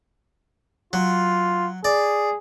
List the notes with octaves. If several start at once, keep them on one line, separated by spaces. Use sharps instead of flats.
F#3 F4
G#4 D5